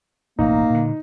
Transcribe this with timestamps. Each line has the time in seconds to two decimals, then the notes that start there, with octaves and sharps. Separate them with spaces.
0.39 E1 A1 A#3 D#4
0.70 A#2 D3